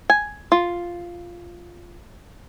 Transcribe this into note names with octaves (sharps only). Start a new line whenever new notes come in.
G#5
F4